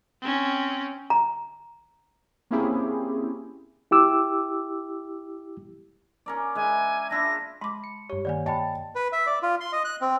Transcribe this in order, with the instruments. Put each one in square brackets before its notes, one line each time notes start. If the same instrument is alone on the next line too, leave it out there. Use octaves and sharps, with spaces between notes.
[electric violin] C4 C#4
[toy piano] A#5
[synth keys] A#3 C4 C#4 E4 G4 G#4
[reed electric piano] E4 G4 D6 E6
[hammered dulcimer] C#4 A#4 D5
[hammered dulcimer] G#3 E4 [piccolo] G#5
[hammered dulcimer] D4 E4 F4 [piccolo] A#6
[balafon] G#3 D6 [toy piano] A5 C6 [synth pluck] B5
[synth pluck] C#7
[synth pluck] G2 C#5 [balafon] G4
[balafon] D#3 A#3 G#5 [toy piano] D5
[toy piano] D#5 G5 B5 [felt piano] A5
[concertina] B4
E5
D5
F4
C6
D#5
F#6
C4